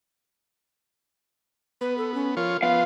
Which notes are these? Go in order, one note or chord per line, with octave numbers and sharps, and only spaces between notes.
B3 B4
A4
C#4
F3 F4 A#4 C#5
F3 B3 F4 B4 F5